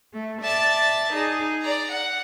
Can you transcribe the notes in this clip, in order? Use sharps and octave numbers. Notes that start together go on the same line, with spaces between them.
A3
D5 E5 A5 A6
D#4 G#4
D5 A#5
F#5